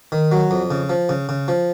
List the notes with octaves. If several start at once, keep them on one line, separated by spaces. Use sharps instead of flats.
D#3
F#3
F2
C#3
F3
C#3
C#3
F3